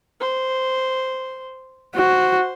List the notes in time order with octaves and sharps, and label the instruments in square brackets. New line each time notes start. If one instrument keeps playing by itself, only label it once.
[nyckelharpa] C5
[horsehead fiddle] F#4 [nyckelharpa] C5